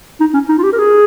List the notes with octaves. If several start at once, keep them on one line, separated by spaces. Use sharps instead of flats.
D#4
C#4
D#4
F4
G4
A#4
G#4